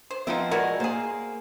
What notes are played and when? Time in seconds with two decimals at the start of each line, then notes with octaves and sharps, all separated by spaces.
0.11 C5
0.27 F3 B3 C4 D#4 E4 E5
0.51 G#3 E4 F#4 A#4 D5
0.80 A#3 G#4 C5